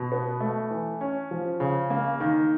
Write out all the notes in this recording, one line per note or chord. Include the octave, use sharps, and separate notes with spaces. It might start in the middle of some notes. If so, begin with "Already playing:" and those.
Already playing: B2
B3
A3
E3
C#4
F3
C#3
A#3
D#3